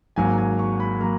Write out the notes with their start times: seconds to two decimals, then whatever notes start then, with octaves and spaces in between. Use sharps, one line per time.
0.16 G#1 G#2 F#3 A#3 G#5
0.38 G#5
0.59 C#6
0.80 B5
1.00 F#3 A#3 A#5